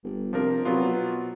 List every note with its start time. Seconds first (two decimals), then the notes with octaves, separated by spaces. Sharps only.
0.04 G1
0.33 C3 F3 D4 A#4
0.65 C3 F#3 B3 F4
0.83 B2